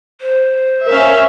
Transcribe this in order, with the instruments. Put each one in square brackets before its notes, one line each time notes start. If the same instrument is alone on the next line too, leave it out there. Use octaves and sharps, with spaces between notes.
[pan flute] C5
[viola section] C#4 E5 F5 [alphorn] A#4